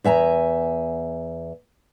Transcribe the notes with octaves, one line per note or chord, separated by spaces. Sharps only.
E2 E5 G#5 A#5